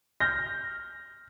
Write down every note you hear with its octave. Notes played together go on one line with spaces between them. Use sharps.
F6 G6 A#6